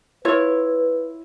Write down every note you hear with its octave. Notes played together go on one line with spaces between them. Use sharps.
E4 F4 B4 C#5